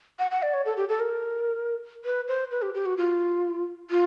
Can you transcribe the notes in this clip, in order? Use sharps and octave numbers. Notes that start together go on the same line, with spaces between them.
F#5
F#5
D5
C#5
A4
G4
A4
A#4
B4
C5
B4
G4
G4
F#4
F4
F4